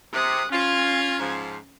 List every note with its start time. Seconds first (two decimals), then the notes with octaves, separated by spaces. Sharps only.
0.14 C3 D#6 F#6
0.52 C#4 F4 G#6
1.19 G#2 F3